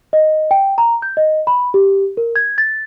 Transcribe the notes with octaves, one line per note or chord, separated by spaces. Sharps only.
D#5
G5
A#5
G6
D#5
B5
G4
A#4
G#6
A6